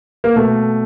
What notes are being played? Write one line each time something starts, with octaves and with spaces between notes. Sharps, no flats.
A#3
B2 A3